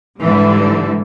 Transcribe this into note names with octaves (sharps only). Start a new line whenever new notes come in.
G#2 D3 E3 G3